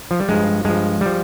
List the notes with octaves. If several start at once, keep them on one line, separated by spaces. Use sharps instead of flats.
F3
G3
G2 F3 G#3
G2 F3 G#3
F3 G3